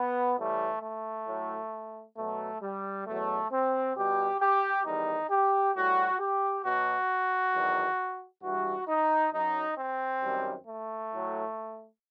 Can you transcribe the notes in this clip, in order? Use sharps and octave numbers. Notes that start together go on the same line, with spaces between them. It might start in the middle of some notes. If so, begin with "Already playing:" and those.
Already playing: B3
A2 E3 G3 A3
A3
A2 F#3
B2 F#3 A3
G3
E2 B2 F#3 A3
C4
B2 G3 G4
G4
E2 D#3 G3 D#4
G4
A2 G3 F#4
G4
B2 F#3 F#4
E2 D#3 F#3
G2 E3 G3 F#4
D#4
F#2 F#3 D#4
C4
F#2 D#3 G3
A3
A2 F#3